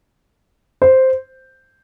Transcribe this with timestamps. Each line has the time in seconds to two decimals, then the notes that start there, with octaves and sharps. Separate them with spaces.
0.82 C5